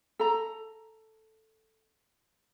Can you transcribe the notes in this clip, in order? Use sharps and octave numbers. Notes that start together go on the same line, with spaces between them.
A4 A#5